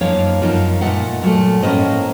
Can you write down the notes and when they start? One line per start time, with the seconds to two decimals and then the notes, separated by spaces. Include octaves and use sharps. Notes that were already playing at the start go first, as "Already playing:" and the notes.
0.01 F#2 F3 A#3 D#4 C#5 F5
0.41 F#2 F3 A#3 D#4
0.81 A#2 F#3 A3 D#5 F#5
1.22 A#2 F#3 A3
1.63 A2 F3 A#3 C#4 C5 D#5